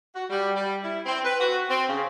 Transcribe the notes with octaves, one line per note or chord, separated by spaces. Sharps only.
F#4
G3
G3
E4
C4
B4
F#4
C4
C#3